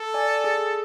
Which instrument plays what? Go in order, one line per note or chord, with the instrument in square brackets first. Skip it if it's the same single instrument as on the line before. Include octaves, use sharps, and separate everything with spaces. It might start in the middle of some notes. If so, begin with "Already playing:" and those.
Already playing: [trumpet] A4
[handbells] D5 G#5
G#4